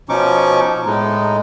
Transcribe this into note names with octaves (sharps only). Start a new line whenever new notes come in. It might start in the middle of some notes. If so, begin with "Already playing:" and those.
B2 F3 C#4 D#4 C#6 D6
A2 G#3 D#4